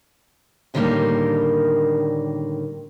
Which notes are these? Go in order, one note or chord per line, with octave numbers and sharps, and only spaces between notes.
A2 D3 D#3 F3 G3 A#3